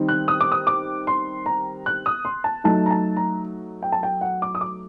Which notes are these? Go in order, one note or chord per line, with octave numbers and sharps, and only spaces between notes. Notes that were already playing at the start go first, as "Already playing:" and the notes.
Already playing: D#3 G3 C4 D#4
F#6
D#6
D6
D#6
D6
C6
A#5
F#6
D#6
C6
A5
F#3 A3 D#4 A5
A#5
A5
A#5
G5
A5
G5
F#5
D6
D#6
D6